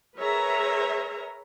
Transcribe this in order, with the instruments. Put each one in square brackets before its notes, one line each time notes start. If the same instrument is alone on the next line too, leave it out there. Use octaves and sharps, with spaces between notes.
[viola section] G#4 A#4 B4 C#5 E5 A#5